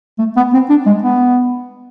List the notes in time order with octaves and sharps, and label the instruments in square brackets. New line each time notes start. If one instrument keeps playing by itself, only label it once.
[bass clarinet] A3
B3
C4
D4
G#3
B3